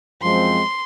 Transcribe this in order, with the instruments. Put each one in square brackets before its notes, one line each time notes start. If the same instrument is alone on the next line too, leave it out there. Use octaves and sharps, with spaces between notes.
[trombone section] F#2 F3 G#3 C4 [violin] C6